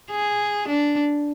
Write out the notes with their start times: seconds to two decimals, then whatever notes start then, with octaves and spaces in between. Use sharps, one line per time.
0.11 G#4
0.68 D4